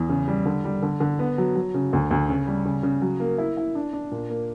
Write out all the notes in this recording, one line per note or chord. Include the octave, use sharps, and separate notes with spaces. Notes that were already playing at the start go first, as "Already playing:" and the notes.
Already playing: E2
C#3
G3
D3
G3
D3
D3
B3
F#3
F#3
C#3
D2
D2
C#3
G3
C#3
C#3
F#3
A#3
E4
E4
D4
D4
A#2
A#3